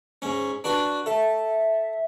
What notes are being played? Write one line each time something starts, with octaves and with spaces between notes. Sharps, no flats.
G#2 C#4
D4 F#4 B4
A4 E5